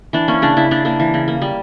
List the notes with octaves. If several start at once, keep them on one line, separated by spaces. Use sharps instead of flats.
E3 D4
A#3 C#4
C#3 D4
C#3 E4
C#3 D4
A#3 D4
E3
C#3
A#3
G3